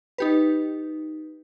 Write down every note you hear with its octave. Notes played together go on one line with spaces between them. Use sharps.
D#4 G4 B4